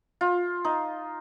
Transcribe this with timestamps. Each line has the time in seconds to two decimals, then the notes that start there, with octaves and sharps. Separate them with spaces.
0.21 F4
0.65 D#4